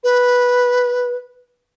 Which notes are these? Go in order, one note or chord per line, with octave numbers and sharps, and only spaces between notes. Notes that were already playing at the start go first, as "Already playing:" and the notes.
B4